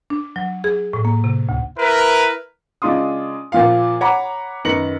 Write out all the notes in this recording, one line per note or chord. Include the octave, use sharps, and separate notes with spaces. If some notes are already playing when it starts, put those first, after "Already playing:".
D4
F#3
G#4
A2
A#3
C3
D2
E4 A#4 B4
C#3 G#3 D4 F4 C6 D#6
A#2 F3 F4 F5
C#5 F#5 A#5 B5 D6
F#2 D#3 B4 A#6 C#7 F#7